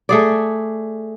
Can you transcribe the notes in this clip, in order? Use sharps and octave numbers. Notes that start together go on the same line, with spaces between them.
A3 G#4 D5